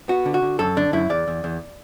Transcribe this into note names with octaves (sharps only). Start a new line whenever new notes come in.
B3 F#4
D3
F#4
D3
F#2 A4
D3 D4
F#2 E4
E2 D5
E2
E2